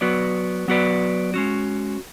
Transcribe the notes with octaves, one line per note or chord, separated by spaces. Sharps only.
F#3 B3 F#4 B4 D5
F#3 B3 F#4 B4 D5
G#3 C#4 F#4